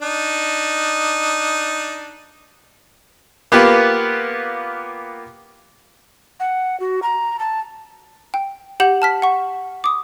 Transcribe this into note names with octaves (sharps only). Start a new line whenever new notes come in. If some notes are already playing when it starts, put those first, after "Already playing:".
D4 D#4
A#3 B3 F4 G4 B4
F#5
F#4
A#5
A5
G5
G4 F#5 G6 F#7
A5 F6 B6
F#5 C#6
D6 D#6